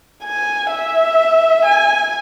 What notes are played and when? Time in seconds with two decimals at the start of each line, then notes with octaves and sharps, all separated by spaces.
0.24 G#5
0.71 E5
1.65 G#5